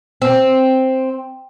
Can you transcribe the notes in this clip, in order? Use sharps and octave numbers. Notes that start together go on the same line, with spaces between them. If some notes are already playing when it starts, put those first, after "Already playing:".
C4